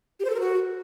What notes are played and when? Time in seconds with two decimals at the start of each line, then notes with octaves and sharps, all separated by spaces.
0.20 G4
0.25 C5
0.30 A4
0.35 A#4
0.40 F#4